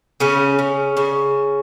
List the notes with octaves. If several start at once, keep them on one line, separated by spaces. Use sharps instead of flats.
C#3 C#4
C#3
C#3